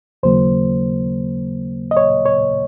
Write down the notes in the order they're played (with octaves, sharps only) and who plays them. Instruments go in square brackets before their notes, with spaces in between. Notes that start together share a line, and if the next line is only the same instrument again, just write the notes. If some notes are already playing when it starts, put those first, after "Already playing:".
[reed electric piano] D#2 C#3 F#3 A#3 C5
D#5
C#5
C#5